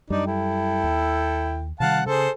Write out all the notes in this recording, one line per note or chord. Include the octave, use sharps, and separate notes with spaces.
F#2 G3 D4 D#4 D5
E4 A4 G5
D#2
C3 D#3 G3 F5 F#5 A5
C#3 G#4 A4 C5